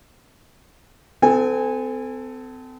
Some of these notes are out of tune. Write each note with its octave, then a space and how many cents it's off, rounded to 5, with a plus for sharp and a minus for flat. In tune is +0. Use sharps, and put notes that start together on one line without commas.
C4 -40 A4 +0 G#5 -15